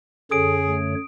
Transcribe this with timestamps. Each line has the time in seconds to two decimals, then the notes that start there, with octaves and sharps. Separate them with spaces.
0.31 F#2 D3 G#4 A4 C#5 D#6 D7
0.67 A3